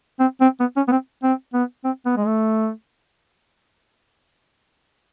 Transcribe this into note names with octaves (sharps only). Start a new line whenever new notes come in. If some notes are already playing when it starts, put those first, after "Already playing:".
C4
C4
B3
C#4
B3
C4
C4
B3
C4
B3
G#3
A3